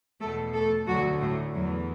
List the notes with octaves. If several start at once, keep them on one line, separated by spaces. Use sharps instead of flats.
E2 B2 A3 A4
A3 A4
D2 D3 F#3 F#4
A2 A3
E2 E3 F#3